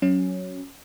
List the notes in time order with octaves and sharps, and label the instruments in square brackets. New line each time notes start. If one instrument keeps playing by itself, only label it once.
[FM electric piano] F#3 C#4